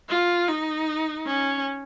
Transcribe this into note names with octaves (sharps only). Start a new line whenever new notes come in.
F4
D#4
C#4